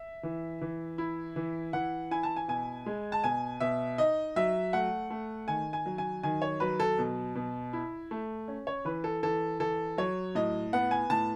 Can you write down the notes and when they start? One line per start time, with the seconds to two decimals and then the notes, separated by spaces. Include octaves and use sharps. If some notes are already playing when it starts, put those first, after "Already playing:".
Already playing: E5
0.23 E3
0.61 E3
0.98 E4
1.36 E3
1.73 E3 F#5
2.11 E4 G#5
2.23 A5
2.36 G#5
2.48 B2 G#5
2.86 G#3
3.12 A5
3.23 B2 G#5
3.60 B2 E5
3.98 D#4 D#5
4.36 F#3 E5
4.73 A3 F#5
5.10 A3
5.48 D#3 G#5
5.73 G#5
5.86 F#3
5.98 G#5
6.23 D#3 G#5
6.42 C#5
6.60 F#3 B4
6.80 A4
6.98 B2
7.35 B2
7.73 E4
8.11 A3
8.48 C#4
8.67 C#5
8.85 E3 B4
9.04 A4
9.23 E3 A4
9.60 E3 A4
9.98 F#3 C#5
10.35 A2 D#5
10.73 B3 F#5
10.91 G#5
11.10 A2 A5